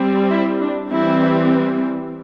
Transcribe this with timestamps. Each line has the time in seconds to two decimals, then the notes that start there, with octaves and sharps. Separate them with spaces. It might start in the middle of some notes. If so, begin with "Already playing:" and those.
Already playing: G3 C4
0.31 E4
0.61 D4
0.91 E3 G3 C4 E4